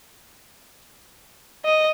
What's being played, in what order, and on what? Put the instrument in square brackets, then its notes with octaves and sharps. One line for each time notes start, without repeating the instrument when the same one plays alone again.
[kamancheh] D#5